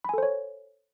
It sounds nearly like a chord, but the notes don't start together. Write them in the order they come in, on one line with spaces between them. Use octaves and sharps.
B5 G#5 A4 C5 C#5